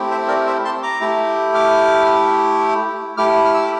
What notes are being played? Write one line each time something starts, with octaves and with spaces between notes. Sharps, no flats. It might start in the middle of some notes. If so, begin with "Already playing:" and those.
Already playing: A3 C4 E4 G4
C5 E5
A#4 D5
C5 E5
A5 C6
A#5 D6
A3 E4 G4
D6 F6
A3 E4 G4 D6 F6
F6
E6
D6